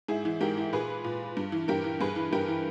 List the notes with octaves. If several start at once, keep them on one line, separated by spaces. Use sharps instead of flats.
G#2 E4 G#4
E3
G#2 G4 A#4
E3
A#2 G#4 B4
A#2
G2
E3
G2 G4 A#4
E3
G2 G#4 B4
E3
G2 G4 A#4
E3